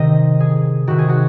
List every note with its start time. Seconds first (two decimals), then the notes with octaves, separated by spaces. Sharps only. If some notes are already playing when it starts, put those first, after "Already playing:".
Already playing: C3 D#3 D#5
0.40 G#4
0.87 C3 D#3 F#4
0.98 G#4
1.09 F#4